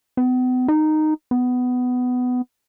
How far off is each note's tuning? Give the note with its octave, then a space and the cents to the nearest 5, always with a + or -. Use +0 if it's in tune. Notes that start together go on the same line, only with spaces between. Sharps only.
B3 +40
D#4 -10
B3 +15